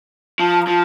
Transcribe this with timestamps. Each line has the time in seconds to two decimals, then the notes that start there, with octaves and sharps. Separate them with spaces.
0.40 F3 A5
0.62 A#5
0.67 F3 A5